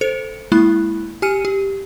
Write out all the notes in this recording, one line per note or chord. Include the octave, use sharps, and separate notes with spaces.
A4 C5 C#7
G#3 A#3 E4 B5 F#6
G4 G#5 F6 C#7 D#7
G4